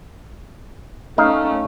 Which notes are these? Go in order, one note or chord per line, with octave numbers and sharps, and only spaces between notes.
A3 C#4 D#4 F5